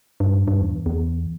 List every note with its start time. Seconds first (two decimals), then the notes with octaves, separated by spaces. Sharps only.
0.20 G2
0.48 G2
0.61 E2
0.86 E2